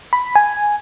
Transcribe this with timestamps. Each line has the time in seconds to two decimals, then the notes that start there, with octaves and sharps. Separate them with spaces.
0.13 B5
0.36 G#5